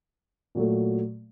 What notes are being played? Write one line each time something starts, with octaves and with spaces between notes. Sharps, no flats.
A#2 F#3 A3